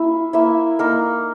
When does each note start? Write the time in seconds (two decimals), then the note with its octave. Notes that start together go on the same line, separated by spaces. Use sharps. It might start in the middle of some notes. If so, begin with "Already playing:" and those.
Already playing: A#3 E4 F4 E5
0.33 A#3 E4 E5
0.79 A#3 D#4 A#4